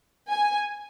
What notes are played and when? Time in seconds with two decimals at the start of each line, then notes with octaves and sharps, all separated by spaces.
0.31 G#5